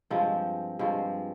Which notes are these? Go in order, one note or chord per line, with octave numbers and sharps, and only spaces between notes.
G2 F3 G#3 C4
G2 F3 G#3 C4